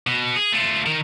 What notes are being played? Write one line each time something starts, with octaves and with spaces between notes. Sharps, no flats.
B2
G#4
A3 F4
D#3 A#4